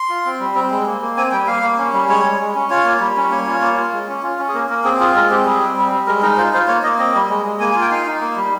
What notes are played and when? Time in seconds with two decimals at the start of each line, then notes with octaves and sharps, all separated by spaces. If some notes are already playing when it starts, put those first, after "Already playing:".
Already playing: C6
0.10 F4
0.25 C4
0.40 G3
0.55 C4
0.71 G#3
0.86 A#3
1.01 A#3
1.17 C4 G#5
1.32 G3 G5
1.47 A#3 F5
1.62 A#3
1.78 C#4
1.93 G3
2.09 G#3 C#5
2.25 G#3
2.39 G#3
2.55 C#4
2.70 F4 C#5
2.85 A#3
3.00 G3
3.16 C#4
3.31 A#3 C#5
3.47 F4
3.61 A#3
3.77 F4
3.92 G#3
4.08 C#4
4.23 F4
4.39 C#4
4.49 G#4
4.54 A#3 A#4
4.69 A#3 A#4
4.84 C4 G#4
5.00 F4 G#4
5.15 G#3 A#4
5.30 C4 G4
5.45 G3 G#4
5.61 C4
5.77 G3
5.92 G3
6.07 G#3 A#4
6.22 D#4 A#4
6.37 F4 C5
6.53 F4 C5
6.68 A#3 C#5
6.83 A#3 D#5
6.98 C4 D#5
7.15 G3
7.29 G#3
7.45 G#3
7.60 A#3 G#5
7.71 G#5
7.75 F4
7.81 G5
7.90 D#4 F5
8.07 D#4
8.21 A#3
8.36 G3